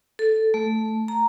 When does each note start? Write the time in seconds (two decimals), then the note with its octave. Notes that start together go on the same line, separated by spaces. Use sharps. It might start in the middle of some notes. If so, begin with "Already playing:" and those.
0.19 A4
0.54 A3
1.08 A#5